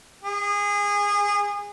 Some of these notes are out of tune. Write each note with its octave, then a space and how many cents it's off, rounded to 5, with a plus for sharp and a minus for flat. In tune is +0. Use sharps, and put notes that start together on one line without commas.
G#4 -25